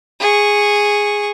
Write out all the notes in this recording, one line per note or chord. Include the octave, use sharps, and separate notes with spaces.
G#4 C#6